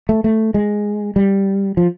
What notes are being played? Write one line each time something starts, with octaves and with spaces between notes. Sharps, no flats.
A3
A3
G#3
G3
F3